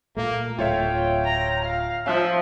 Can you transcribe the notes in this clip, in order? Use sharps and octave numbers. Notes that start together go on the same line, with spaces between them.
A#2 A3 A#3
D1 A3 F4 C#5 E5 G5
A#5
F5
F3 E5 F5